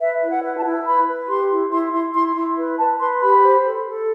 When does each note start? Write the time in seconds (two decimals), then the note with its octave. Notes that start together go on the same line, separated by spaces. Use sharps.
0.01 B4 E5
0.22 E4
0.30 F#5
0.44 B4
0.58 A5
0.65 E4
0.86 B4 B5
1.08 B4
1.29 G4 C6
1.50 E4
1.72 E4 C6
1.93 E4 C6
2.15 E4 C6
2.36 E4 C6
2.57 B4
2.78 B4 A5
3.00 B4 C6
3.21 G4 B5
3.43 C5
3.65 A4
3.86 A4